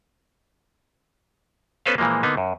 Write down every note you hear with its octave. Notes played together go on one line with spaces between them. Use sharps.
B3 C#4 A4 B4 C5 F5
A#2 E3 F3 G#3 A#3
D3 A#3 B3 D#4
F#2